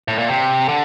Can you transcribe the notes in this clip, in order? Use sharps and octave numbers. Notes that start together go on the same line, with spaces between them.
A2
A#2
C3
D3